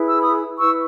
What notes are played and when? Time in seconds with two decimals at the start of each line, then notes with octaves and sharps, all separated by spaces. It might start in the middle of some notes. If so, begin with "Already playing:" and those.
Already playing: E4 G#4 B4
0.09 E6
0.20 B5 D#6
0.58 E4 B4 C#6 E6